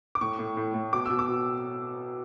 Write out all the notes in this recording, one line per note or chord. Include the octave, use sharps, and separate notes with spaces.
D6
A2 C#6
A2
A2
A2
B2 D6
B2 E6
D6
B2